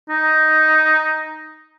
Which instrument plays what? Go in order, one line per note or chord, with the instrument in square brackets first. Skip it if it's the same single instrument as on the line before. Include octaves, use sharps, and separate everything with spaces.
[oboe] D#4